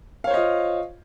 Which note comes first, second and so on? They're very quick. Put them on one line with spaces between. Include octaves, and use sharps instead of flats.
F5 C#5 C5 D#5 F4